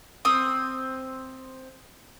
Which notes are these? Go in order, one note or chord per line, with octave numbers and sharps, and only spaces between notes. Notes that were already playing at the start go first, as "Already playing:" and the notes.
C4 D#6